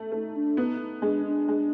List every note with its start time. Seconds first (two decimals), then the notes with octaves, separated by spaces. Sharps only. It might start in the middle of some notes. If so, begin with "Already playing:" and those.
Already playing: A3
0.12 A3 D#4
0.35 D4
0.57 B3 D#4
0.80 D#4
1.02 G#3 D4
1.25 D4
1.48 G#3